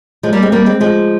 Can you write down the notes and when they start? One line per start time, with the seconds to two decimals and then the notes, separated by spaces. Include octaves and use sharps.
0.23 F3 G#3
0.33 G3 A#3
0.42 G#3 C4
0.52 G3 A#3
0.66 G#3 C4
0.80 F3 G#3